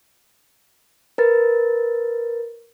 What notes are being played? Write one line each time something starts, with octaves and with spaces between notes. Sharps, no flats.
A#4 B4 A6